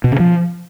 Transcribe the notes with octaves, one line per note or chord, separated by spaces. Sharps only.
B2
C#3
F3